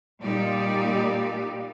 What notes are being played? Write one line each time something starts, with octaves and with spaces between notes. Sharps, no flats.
A#2 G3 D#4 G4 D5